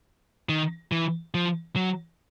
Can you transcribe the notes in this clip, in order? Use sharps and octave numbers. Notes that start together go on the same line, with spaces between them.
D#3
E3
F3
F#3